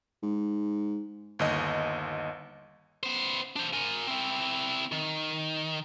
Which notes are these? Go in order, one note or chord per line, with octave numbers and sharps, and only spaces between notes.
G#2
G1 D#2 D#5
B3 C5
D4 C5
A#4 G#5
C4 E4
D#3